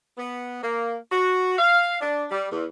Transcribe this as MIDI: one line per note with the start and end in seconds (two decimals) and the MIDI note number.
0.18 0.62 59
0.62 0.95 58
1.11 1.57 66
1.58 1.96 77
2.01 2.24 62
2.31 2.48 55
2.51 2.65 40